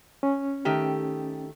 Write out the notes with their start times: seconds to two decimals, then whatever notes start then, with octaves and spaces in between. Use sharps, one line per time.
0.23 C#4
0.65 D#3 A3 G4